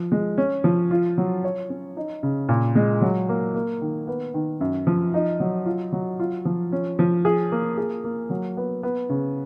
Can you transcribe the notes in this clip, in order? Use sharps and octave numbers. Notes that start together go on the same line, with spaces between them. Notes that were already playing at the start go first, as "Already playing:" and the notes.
Already playing: F3
G#3
C#4
F3
F4
F#3
C#5
C#4
D#4
C#3
A#2
G#3
F#3
A#3
A#3
D#3
B3
D#3
F#2
F3
D#4
F#3
F4
F#3
F4
F3
C#4
F3
G#4
A#3
G#4
A#3
F#3
B3
B3
C#3